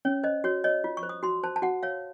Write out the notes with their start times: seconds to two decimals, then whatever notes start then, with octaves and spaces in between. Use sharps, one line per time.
0.05 C#4 C#5
0.24 C5 D#5
0.44 F#4 C#5
0.64 C#5 D#5
0.84 F4
0.97 C#6
1.03 C5
1.09 D#6
1.23 F#4 C6
1.44 C5 A5
1.56 A5
1.62 F#4 F#5
1.83 C#5 F5